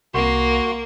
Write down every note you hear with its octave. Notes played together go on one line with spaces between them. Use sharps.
C2 A#3 F#4 C6